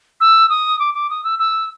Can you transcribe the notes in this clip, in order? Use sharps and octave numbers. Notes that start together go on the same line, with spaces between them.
E6
D#6
D6
D6
D#6
E6
E6